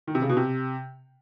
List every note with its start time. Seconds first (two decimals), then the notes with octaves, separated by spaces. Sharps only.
0.07 D#3
0.15 C3
0.22 C#3
0.29 B2
0.37 C3